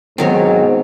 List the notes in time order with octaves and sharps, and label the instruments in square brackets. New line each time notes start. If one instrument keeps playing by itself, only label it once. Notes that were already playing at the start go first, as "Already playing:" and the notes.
[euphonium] G#2 [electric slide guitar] B2 F#3 C4 [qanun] D#3 A#4 C#5